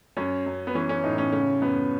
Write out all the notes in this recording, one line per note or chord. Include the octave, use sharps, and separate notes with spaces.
F#2 C#4
F#2
B3
E3 C#4
C#4
A2 D#4
C#4
C#3 C#4
F#2 B3